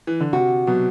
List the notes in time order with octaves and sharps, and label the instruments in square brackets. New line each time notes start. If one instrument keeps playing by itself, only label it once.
[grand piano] E3
D3
[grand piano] C3 [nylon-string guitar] F#4
[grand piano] B2 [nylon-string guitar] F#3